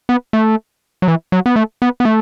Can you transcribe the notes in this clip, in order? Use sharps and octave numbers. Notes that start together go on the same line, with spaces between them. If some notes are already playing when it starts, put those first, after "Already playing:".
B3
A3
F#3
E3
F#3
B3
A3
B3
B3
A3